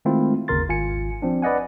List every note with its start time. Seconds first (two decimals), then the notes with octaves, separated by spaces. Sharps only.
0.05 D#3 G#3 A3 C4 E4 F4
0.48 G1 D#2 C#3 A#4 C6 A6
0.69 G#1 F4 G#5 C#7
1.22 F3 C4 D4
1.42 B4 D5 D#5 F#5 G#5